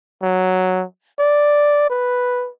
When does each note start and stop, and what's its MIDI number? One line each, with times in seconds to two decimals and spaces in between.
0.23 0.85 54
1.20 1.88 74
1.90 2.50 71